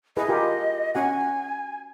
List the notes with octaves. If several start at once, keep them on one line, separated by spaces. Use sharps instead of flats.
E4 G#4 B4 D#5
F4 G4 A#4
C#4 F#4 F#5 G#5